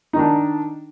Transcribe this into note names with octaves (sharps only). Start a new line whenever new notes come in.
D#3 D4 D#4